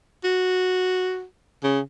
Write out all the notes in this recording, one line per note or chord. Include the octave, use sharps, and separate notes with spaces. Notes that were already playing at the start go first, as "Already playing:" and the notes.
F#4
C#3